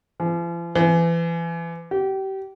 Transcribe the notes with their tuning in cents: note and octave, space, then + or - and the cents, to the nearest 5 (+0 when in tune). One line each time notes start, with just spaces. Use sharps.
F3 -45
E3 +30
G4 -30